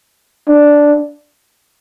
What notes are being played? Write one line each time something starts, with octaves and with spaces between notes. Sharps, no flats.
D4